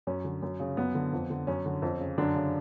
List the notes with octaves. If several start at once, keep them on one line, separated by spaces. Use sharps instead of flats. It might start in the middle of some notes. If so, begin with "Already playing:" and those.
F#2 C#4
D3
F#2
C#3
F#2 B3
D3
F2
D3
F#2 C#4
D3
F2
C#3
F#2 D3 D4
C#3